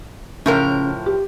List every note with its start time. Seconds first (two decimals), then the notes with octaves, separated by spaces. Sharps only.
0.46 A2 C#3 F3 A#4
1.06 G4